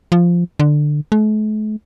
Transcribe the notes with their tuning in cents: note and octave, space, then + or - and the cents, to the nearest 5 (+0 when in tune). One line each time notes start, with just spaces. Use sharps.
F3 -5
D3 +15
A3 -45